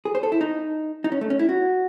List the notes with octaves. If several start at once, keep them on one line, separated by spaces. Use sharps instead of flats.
G#4
C5
A4
E4
D#4
D#4
C#4
A3
C#4
E4
F#4